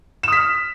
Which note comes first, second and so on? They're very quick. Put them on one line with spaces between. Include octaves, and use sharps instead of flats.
E7 D#6 B6 F6